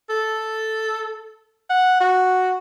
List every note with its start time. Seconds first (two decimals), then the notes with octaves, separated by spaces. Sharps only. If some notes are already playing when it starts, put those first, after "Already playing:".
0.10 A4
1.70 F#5
2.00 F#4